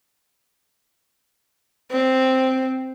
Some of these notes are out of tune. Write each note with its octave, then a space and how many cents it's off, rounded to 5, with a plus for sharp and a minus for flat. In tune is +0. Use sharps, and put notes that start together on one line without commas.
C4 +0